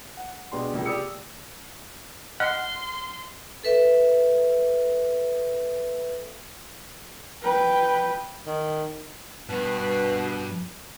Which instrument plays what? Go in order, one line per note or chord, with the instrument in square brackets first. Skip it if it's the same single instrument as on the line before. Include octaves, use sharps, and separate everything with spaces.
[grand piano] F#5
B2 G#3 D4 G5 C6
C#2 C3 A#3
G4 D5 D#6 E6 C#7
[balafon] D#5 [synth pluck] F#5 [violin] C6 [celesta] F6
[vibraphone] A4 B4 E5
[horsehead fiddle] B4 G5
[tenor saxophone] D#3
[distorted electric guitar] G2 [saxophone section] B2 B4